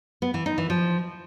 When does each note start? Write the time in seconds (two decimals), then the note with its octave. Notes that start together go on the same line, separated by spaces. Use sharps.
0.22 B3
0.34 E3
0.46 D#4
0.58 E3
0.70 F3